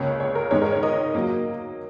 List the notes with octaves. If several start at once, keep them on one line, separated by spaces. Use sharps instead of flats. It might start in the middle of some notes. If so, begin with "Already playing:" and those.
Already playing: C#2 C#3 A#3 C#5
C#5
A#4
G#2 D#3 G#3 C#5
A#4
C#5
A#4 D#5
F#3 A#3